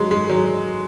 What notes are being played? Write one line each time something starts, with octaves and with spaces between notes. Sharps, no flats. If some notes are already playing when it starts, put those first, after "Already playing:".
Already playing: F#3 G#3
G#3
F#3